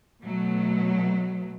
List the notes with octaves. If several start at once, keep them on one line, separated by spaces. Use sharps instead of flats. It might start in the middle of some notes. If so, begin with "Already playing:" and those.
B2 F#3 A3